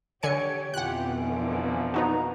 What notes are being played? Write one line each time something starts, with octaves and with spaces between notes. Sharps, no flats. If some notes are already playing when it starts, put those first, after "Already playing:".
D3 G4 C#5 G#5 C#7
F2 B2 E3 F4 G4 F#5 G#5 F#6
D3 F3 A#3
B3 D#4 F#4 A#5